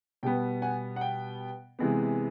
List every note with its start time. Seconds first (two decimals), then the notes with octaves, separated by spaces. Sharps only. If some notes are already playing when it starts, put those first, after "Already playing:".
0.23 B2 G3 B3 G5
0.62 F#5 G#5
0.96 F#5
1.01 G5
1.79 C3 E3 G#3 B3